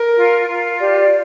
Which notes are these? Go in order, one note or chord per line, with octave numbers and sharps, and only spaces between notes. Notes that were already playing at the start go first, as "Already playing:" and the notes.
Already playing: A#4
F4
F4
G4 D5